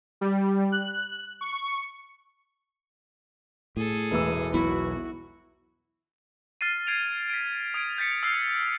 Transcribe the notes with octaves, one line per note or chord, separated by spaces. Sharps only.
G3
F#6
C#6
A2 G#4 A4
E1 E3 E6
B1 B2 E4 F#4
F6 A6 C7 D#7
G#6 C7 D7 F7
B6 D7
D#6 G#6 D7
G6 A6 B6 C#7
E6 F6 A6 C7